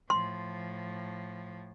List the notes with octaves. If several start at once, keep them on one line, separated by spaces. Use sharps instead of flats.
A2 F3 C6